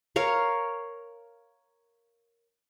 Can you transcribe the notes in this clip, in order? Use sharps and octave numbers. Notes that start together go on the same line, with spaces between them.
A#4 C#5 F5